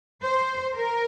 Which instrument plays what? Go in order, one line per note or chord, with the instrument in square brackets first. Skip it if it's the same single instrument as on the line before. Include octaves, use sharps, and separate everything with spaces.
[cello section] C5
A#4